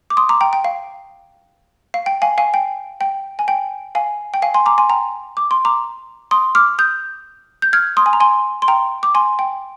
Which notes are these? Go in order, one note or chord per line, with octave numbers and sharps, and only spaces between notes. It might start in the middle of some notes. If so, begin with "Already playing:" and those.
D6
C6 D#6
A#5 D6
G5 A#5
G5
F5
F5
G5
F5 G#5
F5 G#5
G5
G5
G#5
G5
F5 G#5
G5
F5 G#5
G#5 C6
A#5 D6
G#5 C6
G5 A#5
D6
C6
A#5 D6
C6 D#6
D6 F6
D#6 G6
G6
F6 G#6
C6 D#6
G#5
A#5
G#5 C6
C6
G5 A#5
D6
G#5 C6
G5